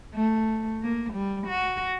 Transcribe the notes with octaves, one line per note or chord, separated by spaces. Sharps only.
A3
A#3
G3
F#4